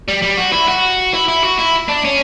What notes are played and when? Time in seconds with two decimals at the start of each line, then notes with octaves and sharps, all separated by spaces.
0.08 G3
0.22 G3
0.38 F#4
0.53 E4
0.68 F#4
1.14 E4
1.28 E4
1.44 F#4
1.58 E4
1.88 D4
2.04 C#4